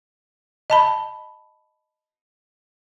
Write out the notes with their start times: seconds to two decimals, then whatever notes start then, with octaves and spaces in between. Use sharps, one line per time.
0.70 D#5 A5 B5